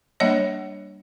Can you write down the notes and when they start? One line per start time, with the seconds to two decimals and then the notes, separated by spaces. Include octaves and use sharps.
0.20 G3 A#3 D4 C#5 D#5